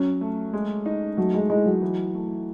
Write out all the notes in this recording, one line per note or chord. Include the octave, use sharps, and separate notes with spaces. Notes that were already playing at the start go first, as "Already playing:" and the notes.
Already playing: F#3 C#4
A3
G#3
D#4
F#3 A3
G#3
G#3 E4
F#3
E3
A3